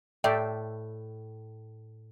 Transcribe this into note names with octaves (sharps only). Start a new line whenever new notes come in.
A2 D5 E5 G5